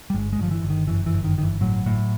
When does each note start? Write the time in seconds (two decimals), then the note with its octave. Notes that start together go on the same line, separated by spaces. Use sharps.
0.10 G3
0.14 G1 G#3
0.33 G#3
0.39 G1 F3
0.51 E3
0.63 G1
0.70 D#3
0.88 F#2 E3
1.06 E3
1.13 G1
1.24 D#3
1.37 G1 D#3
1.43 E3
1.61 A2 F#3
1.86 A2